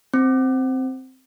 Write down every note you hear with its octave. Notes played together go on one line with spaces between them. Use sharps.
C4